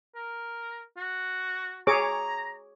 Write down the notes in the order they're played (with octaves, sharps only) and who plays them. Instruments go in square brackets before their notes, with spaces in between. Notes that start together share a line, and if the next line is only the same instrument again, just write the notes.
[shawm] A#4
F#4
[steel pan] G#4 C#5 D6 [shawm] A#5